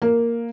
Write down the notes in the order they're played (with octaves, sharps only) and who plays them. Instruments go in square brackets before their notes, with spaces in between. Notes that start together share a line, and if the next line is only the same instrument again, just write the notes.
[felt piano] A#3